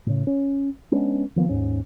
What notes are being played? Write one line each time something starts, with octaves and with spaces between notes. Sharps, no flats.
A2 C#3
C#4
G#3 B3 C#4 D4
D#3 F3 A#3 B3
D#2 G#2 C#4